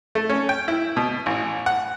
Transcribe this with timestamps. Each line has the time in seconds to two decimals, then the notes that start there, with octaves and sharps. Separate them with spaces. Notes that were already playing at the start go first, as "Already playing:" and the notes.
0.15 A3
0.29 C#4
0.49 G5
0.68 E4
0.97 B2
1.26 A1
1.66 F#5